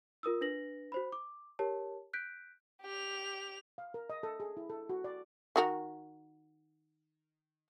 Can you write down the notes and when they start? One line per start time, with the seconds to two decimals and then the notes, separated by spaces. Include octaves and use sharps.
0.23 F4 A#4 D#6 E6
0.41 D4 B4 A#6 F#7
0.92 F#4 C5 B5
1.12 D6
1.59 G4 A#4 C#5 A5
2.13 F#6 G6 B6 D7
2.82 G4 F7
3.78 F5
3.94 A#4
4.10 D#5
4.23 A4
4.40 G#4
4.57 E4
4.70 A4
4.89 F#4
5.04 D5
5.56 D#3 F#4 A#4